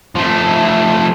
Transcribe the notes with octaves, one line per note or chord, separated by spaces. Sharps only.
F3 A3